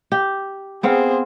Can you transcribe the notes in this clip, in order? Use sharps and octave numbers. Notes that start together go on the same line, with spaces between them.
G4
B3 C4 G#4 C5 F5